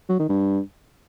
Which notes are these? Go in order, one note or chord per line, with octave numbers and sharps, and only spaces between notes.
F#3
D#3
G2